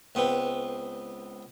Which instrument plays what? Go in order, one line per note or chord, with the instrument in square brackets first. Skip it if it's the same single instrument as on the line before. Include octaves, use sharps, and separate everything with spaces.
[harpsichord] C#2 B3 C4